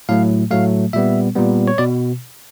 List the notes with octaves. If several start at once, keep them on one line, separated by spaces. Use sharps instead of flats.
A2 F#3 A3 F5
A2 F#3 A3 F5
A#2 G3 B3 E5
A#2 G3 B3
C#5
B2 D5